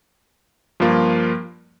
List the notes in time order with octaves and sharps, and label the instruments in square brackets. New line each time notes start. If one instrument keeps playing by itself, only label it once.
[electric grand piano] G2 F3 A#3 F4